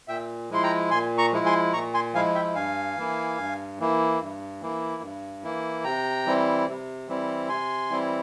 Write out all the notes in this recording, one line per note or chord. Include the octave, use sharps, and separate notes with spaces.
A#2 E5 G5
F3 G#3 E4 C6
G5 A#5
A#2 G#5 C6
A#5 C#6
F3 G#3 E4
G#5 C6
A#2 A#5 C#6
G#5 C6
F3 G#3 E4 F5 G#5
E5 G5
G2 F5 G#5
E3 A#3 E4
G2
E3 A#3 E4
G2
E3 A#3 E4
G2
E3 A#3 E4
C3 G5 A#5
E3 G3 C4 E4
C3
E3 G3 C4 E4
C3 G#5 C6
E3 G3 C4 E4